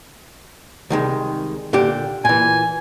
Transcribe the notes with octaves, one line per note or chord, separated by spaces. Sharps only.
C2 D#3 G#3
A#2 D3 G4
A#2 E3 G#5